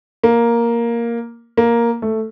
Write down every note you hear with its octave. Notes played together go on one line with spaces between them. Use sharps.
A#3
A#3
A3